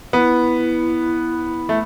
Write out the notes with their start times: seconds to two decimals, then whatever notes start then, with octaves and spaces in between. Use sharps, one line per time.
0.13 B3 E4
1.69 A3